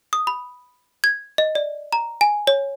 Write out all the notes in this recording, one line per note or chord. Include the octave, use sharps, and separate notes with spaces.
D#6
B5
G#6
D#5
D5
A#5
G#5
C#5